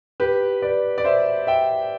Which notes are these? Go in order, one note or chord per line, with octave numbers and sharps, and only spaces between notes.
G4 B4
B4 D5
D5
C5 E5
E5 G5